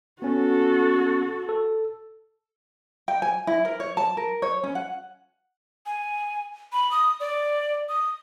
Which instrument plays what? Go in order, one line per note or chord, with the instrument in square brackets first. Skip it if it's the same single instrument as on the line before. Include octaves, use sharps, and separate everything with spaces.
[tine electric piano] B3 C#4 [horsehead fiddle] F#4 A4
[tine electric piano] A4
[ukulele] G5
G#5
E4
A#4
C#5
A5
A#4
C#5
C#4
F#5
[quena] G#5
B5
D#6
D5
D#6